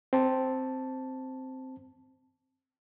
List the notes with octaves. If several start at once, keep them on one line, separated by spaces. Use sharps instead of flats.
C4 A5